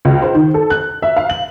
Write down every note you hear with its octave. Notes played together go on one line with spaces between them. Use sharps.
C#2
C5
D#3
A4
F#6
E5
F5
F#7